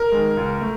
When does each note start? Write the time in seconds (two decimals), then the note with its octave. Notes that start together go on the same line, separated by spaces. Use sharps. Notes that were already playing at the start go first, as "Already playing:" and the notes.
Already playing: A#4
0.12 D#3 G#3
0.37 C#2
0.61 A3